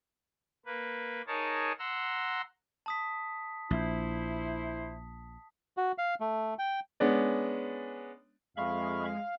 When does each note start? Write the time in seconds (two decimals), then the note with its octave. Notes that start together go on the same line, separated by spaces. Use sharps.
0.66 A#3 B4
1.27 D#4 G#4 A#4 C#5 A5
1.79 F#5 A#5 C6 E6
2.86 A5 D#6 B6
3.71 A#1 E4 C5
5.77 F#4
5.98 F5
6.20 A3
6.59 G5
7.00 G#3 B3 C#4 D4 D5
8.57 F2 G#3 E5 F5 B5 C#6